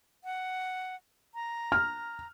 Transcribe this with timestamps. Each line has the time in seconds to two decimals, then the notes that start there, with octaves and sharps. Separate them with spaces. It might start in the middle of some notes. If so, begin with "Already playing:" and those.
0.24 F#5
1.34 A#5
1.72 F6